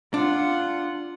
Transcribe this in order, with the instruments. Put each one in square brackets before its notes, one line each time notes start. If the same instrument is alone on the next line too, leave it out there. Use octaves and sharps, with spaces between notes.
[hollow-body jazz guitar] D4 [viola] F4 F#5